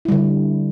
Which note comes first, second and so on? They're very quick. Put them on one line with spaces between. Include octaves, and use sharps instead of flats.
E4 G3 D3